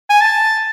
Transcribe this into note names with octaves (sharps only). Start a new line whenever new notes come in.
G#5
A5